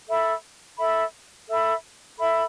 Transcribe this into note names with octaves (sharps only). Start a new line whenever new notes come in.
A4 E5 B5
A4 E5 B5
A4 E5 B5
A4 E5 B5